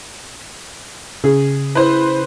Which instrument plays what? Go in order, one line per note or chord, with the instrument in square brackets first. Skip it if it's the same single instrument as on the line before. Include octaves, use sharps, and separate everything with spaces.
[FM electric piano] C#3 [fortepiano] G#4
[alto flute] E4 [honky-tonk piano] B4 C5